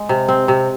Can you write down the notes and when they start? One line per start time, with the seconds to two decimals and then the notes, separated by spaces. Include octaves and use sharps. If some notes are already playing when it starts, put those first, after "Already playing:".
Already playing: G#3
0.09 C3
0.28 C4
0.48 C3